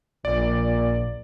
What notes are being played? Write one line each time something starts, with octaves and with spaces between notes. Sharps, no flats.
A#1 A#2 D5